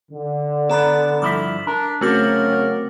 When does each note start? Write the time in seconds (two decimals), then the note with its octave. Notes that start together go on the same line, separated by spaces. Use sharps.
0.12 D3
0.69 B3 D4 A4 A#5 B5
1.22 G2 F3 E4 D6 B6
1.67 D4 A#4
2.01 C#3 F#3 A3 C4 F#4 A#4 D6